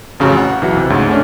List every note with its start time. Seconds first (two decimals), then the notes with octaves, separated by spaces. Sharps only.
0.20 A1 F2 C#3 F#4 G#5 A#5
0.37 F#5
0.62 B1 E3 F#4 F#5
0.77 C3
0.90 D2 G#2 C#3
1.09 A3 C#4 D4